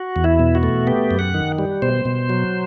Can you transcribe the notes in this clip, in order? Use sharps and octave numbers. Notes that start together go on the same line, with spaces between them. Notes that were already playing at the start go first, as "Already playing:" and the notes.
Already playing: F#4
E2
E4
B2
F#4
A3
B3 G4
F#2
F#5
D#3
G3
B2 C5
B2
F#3